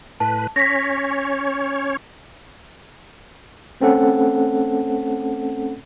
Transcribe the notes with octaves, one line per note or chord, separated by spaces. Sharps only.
A2 B4 A5
C#4 C#5 A#6 B6
A3 C4 C#4 A4 F#5